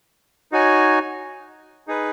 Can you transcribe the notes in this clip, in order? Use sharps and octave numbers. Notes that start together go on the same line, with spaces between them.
D#4 F#4 C#5 G#5
D#4 G#4 B4